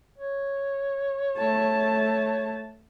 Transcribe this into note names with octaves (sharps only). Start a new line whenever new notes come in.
C#5
A3 A5